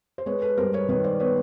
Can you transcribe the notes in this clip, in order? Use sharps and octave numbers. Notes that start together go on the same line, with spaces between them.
C5
G#3 B4 C#5
A4 B4
G2 A#4 C5
B4 C#5
D#3 B4 C#5
C5 D5
B3 B4 C#5